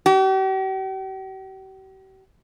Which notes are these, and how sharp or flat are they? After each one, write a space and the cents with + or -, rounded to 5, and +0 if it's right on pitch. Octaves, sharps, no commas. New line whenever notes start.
G4 -45